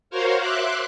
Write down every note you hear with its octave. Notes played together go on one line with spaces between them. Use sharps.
F#4 A#4 C5 C#5 F5
E5 C6 D6 F#6